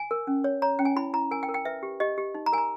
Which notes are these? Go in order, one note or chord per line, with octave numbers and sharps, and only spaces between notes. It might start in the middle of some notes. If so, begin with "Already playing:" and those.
Already playing: G#5
A#4
C#4
C#5
C#5 A#5
C#4 G5
G#5
E4 B5
E4 A#5
A#4 G#5
G5
A#4
G5
B4 E5
G4
G4 D#5
G4
D#4
A#5
A#4 G#5
A#5